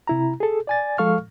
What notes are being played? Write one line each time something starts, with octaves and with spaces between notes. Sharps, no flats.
C3 E4 A#5
G#4 A4
D5 G#5 A6
F3 G#3 A4 F5 C#6 F6